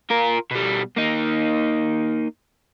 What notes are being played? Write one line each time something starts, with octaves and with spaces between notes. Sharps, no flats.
F4 A#4
B2 G3
A#3 D#4